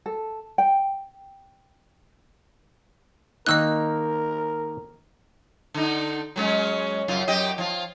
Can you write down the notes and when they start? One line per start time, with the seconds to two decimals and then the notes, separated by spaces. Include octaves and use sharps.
0.06 A4
0.58 G5
3.46 D#3 A#3 D#4 A#4 D#5 E6 F#6
5.74 D3 D#4
6.36 F#3 G#3 C#4
7.08 F#2 C#3 F4
7.28 F#2 G4 D#5
7.58 F3 F4